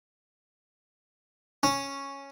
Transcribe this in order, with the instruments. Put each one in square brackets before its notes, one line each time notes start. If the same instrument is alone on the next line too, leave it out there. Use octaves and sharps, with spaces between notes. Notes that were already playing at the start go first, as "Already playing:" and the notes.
[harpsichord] C#4